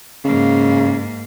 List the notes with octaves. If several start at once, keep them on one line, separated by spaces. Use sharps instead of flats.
G#2 C#3 A#3